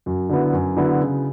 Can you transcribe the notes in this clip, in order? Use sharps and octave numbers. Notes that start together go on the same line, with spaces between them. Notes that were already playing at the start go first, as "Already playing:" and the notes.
F#2
D3 F#3 B3 E4
F#2
D3 F#3 B3 E4
C#3